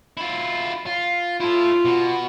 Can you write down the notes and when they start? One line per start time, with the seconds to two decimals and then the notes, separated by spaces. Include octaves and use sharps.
0.17 E4 F4
0.86 F4
1.40 E4 F4 A4
1.85 B2 F#4